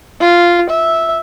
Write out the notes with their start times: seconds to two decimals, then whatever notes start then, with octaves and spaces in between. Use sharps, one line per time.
0.21 F4
0.70 E5